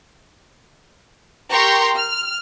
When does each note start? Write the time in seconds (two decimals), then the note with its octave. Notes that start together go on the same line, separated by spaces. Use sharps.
1.51 G4 A#4 G5 A#5 C6 C#6
1.94 F6